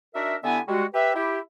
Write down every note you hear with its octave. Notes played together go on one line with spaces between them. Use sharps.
D4 D#4 F#4 A#4 E5
D3 G3 B3 E4 E5 G#5
G3 G#3 F#4
G4 B4 E5
E4 G4